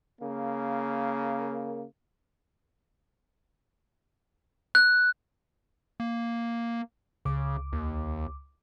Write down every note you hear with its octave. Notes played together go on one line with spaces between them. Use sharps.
C#3 A#3
F#6
A#3
C#2 C#3 D6
D#2